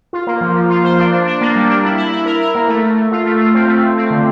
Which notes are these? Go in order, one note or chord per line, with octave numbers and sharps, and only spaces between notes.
F4
A#3
F3
F3
F4
C5
D4
D4
D4
A#3
G3
D4
E4
E4
E4
A#4
A#4
A#3
A3
A3
A3
F4
A3
F4
C4
A3
A3
C4
D3